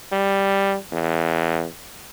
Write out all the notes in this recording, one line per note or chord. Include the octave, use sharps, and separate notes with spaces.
G3
E2